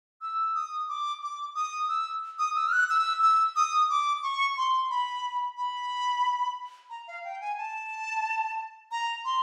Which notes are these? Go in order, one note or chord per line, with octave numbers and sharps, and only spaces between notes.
E6
D#6
D6
D6
D#6
E6
D#6
E6
F6
F#6
E6
E6
D#6
D6
C#6
C6
B5
B5
A#5
F5
G5
G#5
A5
A#5
C6